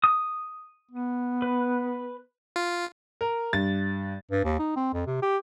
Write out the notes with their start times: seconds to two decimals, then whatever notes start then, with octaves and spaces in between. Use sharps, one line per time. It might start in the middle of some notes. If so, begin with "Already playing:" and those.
0.04 D#6
0.91 B3
1.42 B4
2.56 F4
3.21 A#4
3.53 G2 A6
4.31 G2
4.44 D#2
4.59 D#4
4.76 C4
4.94 F2
5.07 C3
5.22 G4